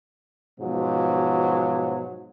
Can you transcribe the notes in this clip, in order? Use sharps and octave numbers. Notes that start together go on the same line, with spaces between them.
G#2 B2 F3 F#3